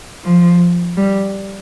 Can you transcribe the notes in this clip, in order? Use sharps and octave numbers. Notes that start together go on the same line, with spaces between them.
F3
G3